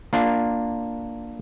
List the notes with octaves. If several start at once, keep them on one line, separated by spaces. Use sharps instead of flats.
A#3 D4 F4